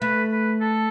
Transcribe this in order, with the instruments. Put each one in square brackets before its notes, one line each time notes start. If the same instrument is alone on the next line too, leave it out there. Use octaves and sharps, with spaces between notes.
[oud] A3 [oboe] B4
[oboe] B4
A4